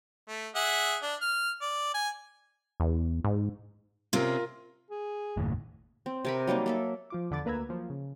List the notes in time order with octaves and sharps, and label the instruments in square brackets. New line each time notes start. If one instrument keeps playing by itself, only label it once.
[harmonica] A3
G#4 E5 F#5
D4
F6
D5
G#5
[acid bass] E2
G#2
[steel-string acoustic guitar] C3 C4 C#4 [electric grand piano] F4 A#4
[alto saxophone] G#4
[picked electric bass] F#1 D#2 A2
[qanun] C4
C3 A#4 B5
F#3 G3 A#3 D#4
A#3 A4 E5
[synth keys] F3 F4 D6
E2 D3 B5 D6 A6
D2 A#3 B4 A#5 E6 G#6
F3 F#3 A#3
C#3